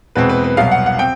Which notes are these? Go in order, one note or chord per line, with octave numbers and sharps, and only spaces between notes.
E2 B2 G#3 C4 B4
B4
B4
C2 B2 F#3 B3 F5
F#5
F#5
C4 G5